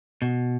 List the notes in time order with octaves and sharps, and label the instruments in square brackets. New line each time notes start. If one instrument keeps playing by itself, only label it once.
[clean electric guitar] B2